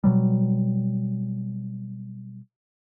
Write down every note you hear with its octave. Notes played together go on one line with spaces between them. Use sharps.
B2 F#3 G3